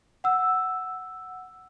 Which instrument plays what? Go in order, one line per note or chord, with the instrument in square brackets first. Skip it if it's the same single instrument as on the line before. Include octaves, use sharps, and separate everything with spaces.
[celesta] F#5 E6